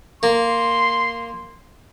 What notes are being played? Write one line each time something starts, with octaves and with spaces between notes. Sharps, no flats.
A#3 C6